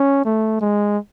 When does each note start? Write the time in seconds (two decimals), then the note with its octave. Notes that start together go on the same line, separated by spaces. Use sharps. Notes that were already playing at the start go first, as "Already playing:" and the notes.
Already playing: C#4
0.25 A3
0.61 G#3